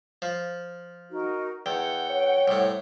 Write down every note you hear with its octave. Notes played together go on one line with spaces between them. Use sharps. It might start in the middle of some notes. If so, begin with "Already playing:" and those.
F3
D#4 F#4 A#4
E2 F#5 G5
C#5
C2 A2 G5